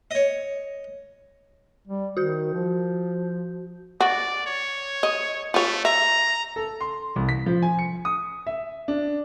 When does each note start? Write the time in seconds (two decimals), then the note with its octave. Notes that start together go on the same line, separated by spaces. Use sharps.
0.11 C#5 D#5
1.87 G3
2.17 D#3 F#4 G6
2.53 F3
4.00 F#4 D5
4.46 C#5
5.03 D#5
5.54 A3 F4 C#5
5.85 E5 A#5
6.56 A4
6.81 C6
7.16 C2
7.29 B6
7.46 F3
7.63 G#5
7.79 C#7
8.05 D#6
8.47 E5
8.88 D4